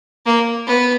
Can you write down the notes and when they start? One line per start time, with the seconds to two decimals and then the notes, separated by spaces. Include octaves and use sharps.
0.26 A#3
0.67 B3